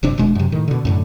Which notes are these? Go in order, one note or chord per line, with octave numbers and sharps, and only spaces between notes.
F#1 C3 D4
D#1 B2 G#3 D4
F#2 C3
A2 D#3
B2 D3
F#2 A2 D3